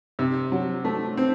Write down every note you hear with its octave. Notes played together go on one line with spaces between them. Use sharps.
C3
F#3
A3
C4